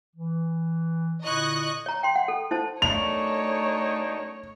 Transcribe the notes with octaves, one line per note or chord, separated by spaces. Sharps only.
E3
A#2 D3 E4 D#5 C#6 F#6
C#5 A#5
G5 C6
F#5
A4
E4 C5 A5
F#2 A3 D4 D#4 C#5 F7